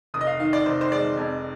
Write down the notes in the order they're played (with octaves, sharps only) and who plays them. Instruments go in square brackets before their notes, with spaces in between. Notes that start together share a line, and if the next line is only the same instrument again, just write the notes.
[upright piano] F1 D#6
D#5
F5
D#3 F5
D5
F1 C5
C5
G#3 D5
F2